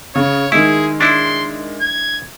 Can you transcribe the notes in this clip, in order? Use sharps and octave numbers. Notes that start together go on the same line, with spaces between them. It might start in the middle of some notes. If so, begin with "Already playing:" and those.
C#3 C#5
D#3 G#3 E4 G#4
D4 E4 C6
G#6